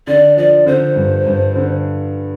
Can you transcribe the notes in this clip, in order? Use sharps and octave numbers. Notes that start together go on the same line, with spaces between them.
D3 D5
F3 D5
D3 C5
G2
G2
D3